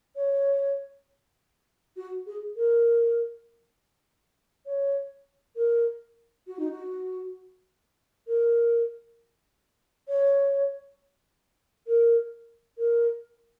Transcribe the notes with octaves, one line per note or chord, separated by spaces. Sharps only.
C#5
F#4
G#4
A#4
C#5
A#4
F#4
D#4
F#4
A#4
C#5
A#4
A#4